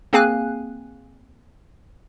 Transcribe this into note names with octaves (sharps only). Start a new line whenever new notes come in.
A#3 C4 G#4 F5 G#5 F#6